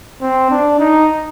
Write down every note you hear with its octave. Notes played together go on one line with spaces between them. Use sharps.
C4
D4
D#4